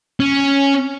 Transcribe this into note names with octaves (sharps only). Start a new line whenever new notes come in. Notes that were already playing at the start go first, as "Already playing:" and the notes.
C#4